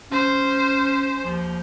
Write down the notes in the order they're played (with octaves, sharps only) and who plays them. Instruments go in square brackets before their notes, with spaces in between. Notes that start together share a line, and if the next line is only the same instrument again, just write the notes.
[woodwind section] C#4 [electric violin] C5
[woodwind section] D#2 F3